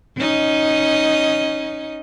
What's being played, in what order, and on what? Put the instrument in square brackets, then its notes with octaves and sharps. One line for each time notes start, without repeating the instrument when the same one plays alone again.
[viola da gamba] C#4 D#4 D#5